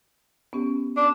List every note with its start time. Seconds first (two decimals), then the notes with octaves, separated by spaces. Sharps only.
0.53 B3 C#4 G4
0.97 D4